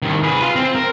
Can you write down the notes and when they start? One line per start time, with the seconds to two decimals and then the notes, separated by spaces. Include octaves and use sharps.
0.02 C2 D#3
0.23 G#4 B4
0.42 F4
0.56 C4
0.75 A#4